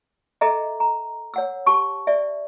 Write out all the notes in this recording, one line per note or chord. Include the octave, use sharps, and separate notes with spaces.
G#4 A4 D#5 E5 A#5
A#5
C#5 F#5 E6
G4 A5 C#6
D5 E5